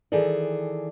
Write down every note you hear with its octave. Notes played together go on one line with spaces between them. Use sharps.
D#3 E3 G#4 A4 D5